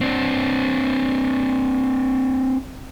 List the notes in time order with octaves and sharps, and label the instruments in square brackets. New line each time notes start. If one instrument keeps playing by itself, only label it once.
[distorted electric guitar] C4 D4